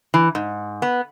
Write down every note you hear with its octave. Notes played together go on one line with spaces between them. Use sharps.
E3
G#2
B3